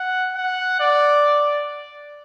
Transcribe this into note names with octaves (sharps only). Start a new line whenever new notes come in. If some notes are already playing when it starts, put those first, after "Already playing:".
Already playing: F#5
F#5
D5